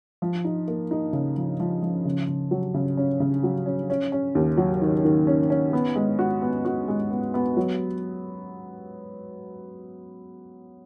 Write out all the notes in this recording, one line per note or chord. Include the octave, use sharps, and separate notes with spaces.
F3
D#4
A#3
D#4
C#3
F3
F3
F3
C#3
C#3
F#3
C#3
C#4
C#3
F#3
C#4
C#4
C#4
D#2
F#3
D#3
D#3
C#4
C#4
B3
G#3
F#4
B3
F#4
G#3
B3
B3
F#3